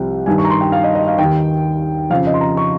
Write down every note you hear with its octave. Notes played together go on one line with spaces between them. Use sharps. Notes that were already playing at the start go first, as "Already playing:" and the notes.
Already playing: C2 C3 F3 G5
G2 D#3 G#5
C#6
A#5
C6
G5
F5
D#5
D#5
F5
D#3 G5
D#2
F2 C#3 F3 F5
D#5
C6
A#5
C#6